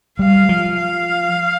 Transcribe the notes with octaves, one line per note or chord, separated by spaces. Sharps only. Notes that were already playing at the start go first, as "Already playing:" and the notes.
G3 F5
F3
F5